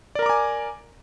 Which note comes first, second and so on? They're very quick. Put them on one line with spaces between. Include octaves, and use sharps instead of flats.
D5 A#4 A#5 D6 G#5